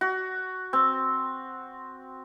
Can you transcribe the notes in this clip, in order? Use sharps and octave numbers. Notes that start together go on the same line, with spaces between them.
F#4
C4